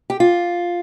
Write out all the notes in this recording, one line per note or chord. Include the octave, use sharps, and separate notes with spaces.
G4
F4